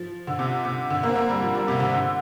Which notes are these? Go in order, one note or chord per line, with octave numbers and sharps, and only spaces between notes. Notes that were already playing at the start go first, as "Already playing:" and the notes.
Already playing: F3
D3
C3
C3
D3
A#3
C4
A#3
G3
F3
G3
C3
D3
D3